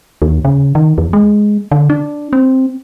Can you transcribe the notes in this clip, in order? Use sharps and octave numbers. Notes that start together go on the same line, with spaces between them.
D#2
C#3
D#3
E2
G#3
D3
D4
C4